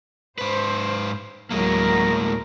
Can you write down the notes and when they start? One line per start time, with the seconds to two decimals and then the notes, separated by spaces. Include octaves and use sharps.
0.38 G#2 B4 C5
1.51 D2 A2 F#3 G#3 A#3 A#4